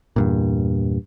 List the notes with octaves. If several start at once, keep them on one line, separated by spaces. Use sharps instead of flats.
E2 G2 A#2